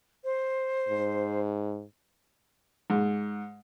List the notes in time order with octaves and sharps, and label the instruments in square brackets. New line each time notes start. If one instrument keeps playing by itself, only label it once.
[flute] C5
[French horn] G#2
[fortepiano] G#2